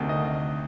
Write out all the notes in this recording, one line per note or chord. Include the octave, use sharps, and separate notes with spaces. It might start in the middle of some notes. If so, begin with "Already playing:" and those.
Already playing: D2 C3 D#3
D#5